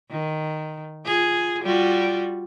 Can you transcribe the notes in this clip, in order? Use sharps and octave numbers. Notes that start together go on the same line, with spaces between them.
D#3
F4 G#4
G3 F4 F#4